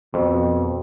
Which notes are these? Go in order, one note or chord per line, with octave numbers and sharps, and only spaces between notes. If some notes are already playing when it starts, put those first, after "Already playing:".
F2 B2